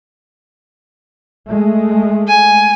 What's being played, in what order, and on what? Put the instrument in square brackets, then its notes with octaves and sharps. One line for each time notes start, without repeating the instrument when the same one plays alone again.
[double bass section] G#3 A3
[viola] G#5